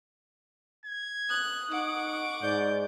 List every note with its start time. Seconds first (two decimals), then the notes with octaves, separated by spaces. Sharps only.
0.85 G#6
1.30 D#6 F#6
1.70 D#4 F#5 C#6 D6
2.42 G#2 D5 G6